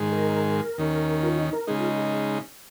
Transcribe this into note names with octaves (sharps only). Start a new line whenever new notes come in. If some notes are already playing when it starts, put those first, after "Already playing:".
Already playing: G#2 D#3 G#3
A#4
D#2 D#3 C#4
F4
D#4
A#4
C#3 G#3 D#4 G#4
F4
G#4
G#4